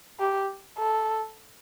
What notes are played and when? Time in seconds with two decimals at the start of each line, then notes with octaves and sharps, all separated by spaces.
0.20 G4
0.78 A4